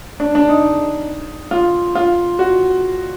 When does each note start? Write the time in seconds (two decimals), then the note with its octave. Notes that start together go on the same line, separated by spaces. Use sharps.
0.20 D4
0.35 D4
0.49 D#4
1.51 F4
1.95 F4
2.39 F#4